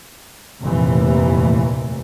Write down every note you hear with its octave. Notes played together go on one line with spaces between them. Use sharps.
F1 D#2 A#2 E3